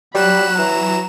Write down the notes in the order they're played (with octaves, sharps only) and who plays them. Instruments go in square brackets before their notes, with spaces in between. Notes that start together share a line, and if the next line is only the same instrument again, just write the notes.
[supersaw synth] F#3 E7 [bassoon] G3 [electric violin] B5 F#6
[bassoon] E3 [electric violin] A#5